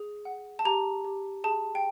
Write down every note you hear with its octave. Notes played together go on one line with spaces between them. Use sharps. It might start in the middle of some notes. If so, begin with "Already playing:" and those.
Already playing: G#4
F#5
A5
G4 A#5
G4
G#4 A5
G5